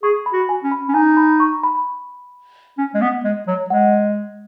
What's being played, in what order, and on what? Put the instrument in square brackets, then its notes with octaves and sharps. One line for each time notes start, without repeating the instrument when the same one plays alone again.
[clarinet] G#4 [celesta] C#6
[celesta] B5
[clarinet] F#4
[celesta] G#5
[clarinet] C#4
[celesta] B5
[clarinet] C#4
[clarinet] D#4 [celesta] G#5
[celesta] B5
C#6
B5
[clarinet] C#4
G#3
B3
G#3
F#3
[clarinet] G#3 [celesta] F#5
[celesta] D#5